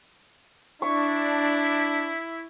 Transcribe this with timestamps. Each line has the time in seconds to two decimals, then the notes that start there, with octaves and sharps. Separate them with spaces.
0.82 D4 E4 C#6